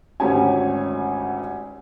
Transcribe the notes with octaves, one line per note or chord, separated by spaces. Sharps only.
G#1 D2 C#4 G4 G#5